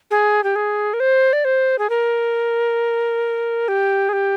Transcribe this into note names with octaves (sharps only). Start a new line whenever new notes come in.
G#4
G4
G#4
A#4
C5
D5
C5
G#4
A#4
G4
G#4
G4